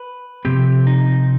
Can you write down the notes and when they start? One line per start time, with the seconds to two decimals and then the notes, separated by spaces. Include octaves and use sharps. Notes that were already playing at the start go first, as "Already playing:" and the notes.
Already playing: B4
0.45 C3 F3 C4 G4
0.87 D#4